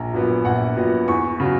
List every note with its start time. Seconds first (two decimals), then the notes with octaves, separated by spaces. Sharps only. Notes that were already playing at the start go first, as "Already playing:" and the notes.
Already playing: A#1 A#5
0.14 A#2 F#3 B3
0.45 A#1 F#5
0.76 A#2 F#3 B3
1.08 E2 C#6
1.40 C#3 F#3